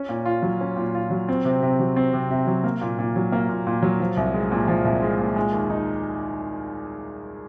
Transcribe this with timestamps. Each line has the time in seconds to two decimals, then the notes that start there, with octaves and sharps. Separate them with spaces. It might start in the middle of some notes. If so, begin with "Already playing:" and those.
Already playing: C#4
0.09 A#2
0.25 F4
0.42 F#3
0.61 C#4
0.77 A#2
0.95 F4
1.11 F#3
1.29 C4
1.45 C3
1.62 C3
1.79 F#3
1.96 C4
2.13 C3
2.31 C3
2.47 F#3
2.64 A#3
2.81 A#2
2.99 A#2
3.16 F#3
3.32 A#3
3.49 A#2
3.67 A#2
3.83 F#3
4.00 F3
4.17 C2
4.34 G#3
4.52 A#2
4.68 F3
4.85 C2
5.02 G#3
5.19 A#2
5.36 G#3
5.53 D#2
5.70 D#4